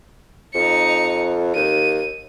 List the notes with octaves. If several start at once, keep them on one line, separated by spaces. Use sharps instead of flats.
F2 D#4 C#7
D#2 D#7